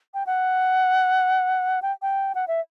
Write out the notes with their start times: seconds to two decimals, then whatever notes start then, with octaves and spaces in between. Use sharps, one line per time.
0.14 G5
0.26 F#5
1.82 G5
2.02 G5
2.35 F#5
2.48 E5